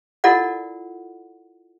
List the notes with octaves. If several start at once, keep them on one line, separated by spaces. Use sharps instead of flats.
E4 F4 A4 A#4 D5 F#5